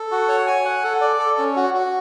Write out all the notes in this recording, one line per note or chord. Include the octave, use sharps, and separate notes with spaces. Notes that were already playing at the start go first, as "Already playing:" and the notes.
Already playing: A4
F#4
C#5
G#5
F#5
A4
D5
A4
C#4
F#4
F#4